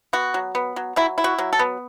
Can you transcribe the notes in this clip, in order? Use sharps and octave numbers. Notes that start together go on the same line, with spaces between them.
B3 F#4
F#3
B3
F#3
F#3 E4
E4
F#4
F#3
A4
B3